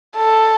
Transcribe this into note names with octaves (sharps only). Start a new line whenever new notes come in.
A4